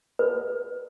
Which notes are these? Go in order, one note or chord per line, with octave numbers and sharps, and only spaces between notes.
B4